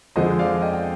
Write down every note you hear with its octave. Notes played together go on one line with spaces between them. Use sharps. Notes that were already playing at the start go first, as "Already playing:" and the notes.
F2 D3 F3 G#3 C5 D#5
D5 F5
D#5 G5
G5